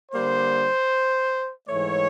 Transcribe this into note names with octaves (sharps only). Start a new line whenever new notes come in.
D3 G3 A#3 C5
G#2 E3 A3 C#5